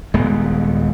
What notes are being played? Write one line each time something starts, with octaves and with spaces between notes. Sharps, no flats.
D#1 G#3 B3